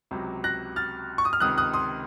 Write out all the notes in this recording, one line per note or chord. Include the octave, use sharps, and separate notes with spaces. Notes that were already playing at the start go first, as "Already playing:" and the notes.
C#2 C3 F#3
F#6 A#6
F6 A6
C#6
D#6
F6
C#2 C3 D#3 D#6 F#6
D#6 F#6
C6 D#6